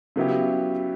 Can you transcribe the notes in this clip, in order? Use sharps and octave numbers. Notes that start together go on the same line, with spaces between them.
C#3 F#3 B3 E4 G4